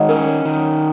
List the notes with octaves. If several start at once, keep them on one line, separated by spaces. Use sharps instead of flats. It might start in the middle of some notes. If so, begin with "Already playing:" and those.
Already playing: D#3 G#3 C#5 D#5 F#5
C#4 A#4
D#3